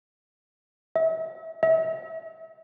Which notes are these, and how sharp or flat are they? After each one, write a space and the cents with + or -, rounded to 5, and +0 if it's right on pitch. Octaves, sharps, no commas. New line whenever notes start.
E5 -35
E5 -35